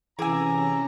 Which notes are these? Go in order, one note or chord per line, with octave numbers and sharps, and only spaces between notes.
C3 E3 C#4 G#4 G#5 A#5 D6 E6